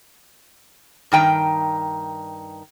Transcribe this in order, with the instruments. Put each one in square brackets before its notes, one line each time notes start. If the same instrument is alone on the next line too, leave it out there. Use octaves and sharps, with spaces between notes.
[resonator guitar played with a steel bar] G2 D#3 G5 A#5